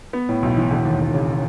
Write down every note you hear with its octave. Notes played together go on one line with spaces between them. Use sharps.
B3
A2
B1
E3
E1
D#2
E1
C#3